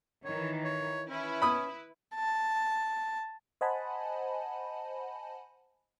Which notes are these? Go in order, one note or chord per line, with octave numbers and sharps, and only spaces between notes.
D#3 E3 C#5
C#5
C#4 E4 B4
B5 D#6
A5
C5 D#5 F#5 G#5 A5 B5